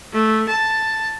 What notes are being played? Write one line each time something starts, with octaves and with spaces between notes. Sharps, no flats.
A3
A5